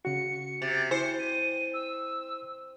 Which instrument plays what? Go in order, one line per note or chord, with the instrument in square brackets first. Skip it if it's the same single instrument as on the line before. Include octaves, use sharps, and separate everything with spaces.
[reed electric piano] C#3 F#4 [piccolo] C#7
[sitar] C3 [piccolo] A6
[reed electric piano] E4 G#5 [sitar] C5 [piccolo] C#7
[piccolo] D#7
E6